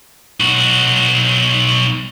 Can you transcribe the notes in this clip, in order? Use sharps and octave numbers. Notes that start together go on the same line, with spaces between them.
B1 F#4